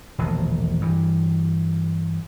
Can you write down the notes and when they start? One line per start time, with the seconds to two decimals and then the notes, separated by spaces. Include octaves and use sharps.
0.18 E1 A#1 B2 D#3
0.81 G2 E3